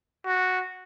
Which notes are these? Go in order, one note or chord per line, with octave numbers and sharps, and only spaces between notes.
F#4